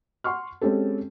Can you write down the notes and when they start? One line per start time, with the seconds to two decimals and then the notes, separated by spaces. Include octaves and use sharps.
0.24 F#5 C6 C#6 F6
0.61 G#3 C4 C#4 G4 A4